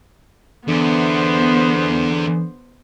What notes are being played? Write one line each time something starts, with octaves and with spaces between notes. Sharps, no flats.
E2 D3 B3 C5